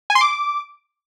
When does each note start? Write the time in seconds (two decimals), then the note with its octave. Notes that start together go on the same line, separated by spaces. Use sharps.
0.10 G#5
0.15 C6
0.21 D6